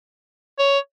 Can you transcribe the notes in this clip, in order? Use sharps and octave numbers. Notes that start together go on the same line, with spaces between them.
C#5